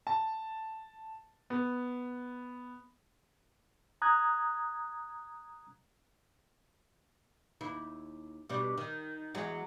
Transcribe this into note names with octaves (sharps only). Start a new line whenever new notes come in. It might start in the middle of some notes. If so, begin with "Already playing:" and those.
A5
B3
A#5 D#6 F#6 G#6
D#2 E4
B2 G3 D4
D#3
E2 F#3 G#3